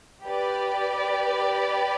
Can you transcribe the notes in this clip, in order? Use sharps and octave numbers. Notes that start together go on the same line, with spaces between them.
G4 B4 D5